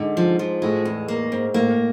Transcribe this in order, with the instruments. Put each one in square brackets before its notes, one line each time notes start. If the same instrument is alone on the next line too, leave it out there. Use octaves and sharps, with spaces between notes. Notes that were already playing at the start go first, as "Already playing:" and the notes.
Already playing: [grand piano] G#2 [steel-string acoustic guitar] D3
[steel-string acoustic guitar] F3
F3
[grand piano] A2 [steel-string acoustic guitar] G#3
[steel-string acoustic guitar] E2
A#3
G#2
[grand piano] A2 [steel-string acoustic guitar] A#3